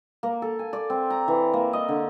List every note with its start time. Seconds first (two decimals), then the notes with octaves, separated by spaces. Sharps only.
0.23 A#3
0.42 A4
0.59 G#5
0.73 D5
0.90 C4
1.10 A#5
1.28 E3
1.53 A#3
1.73 D#5
1.88 D3